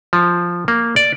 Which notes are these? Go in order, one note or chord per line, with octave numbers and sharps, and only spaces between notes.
F3
A#3
D5